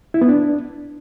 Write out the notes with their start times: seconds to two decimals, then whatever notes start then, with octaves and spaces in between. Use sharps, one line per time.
0.14 E4
0.22 B3
0.29 D4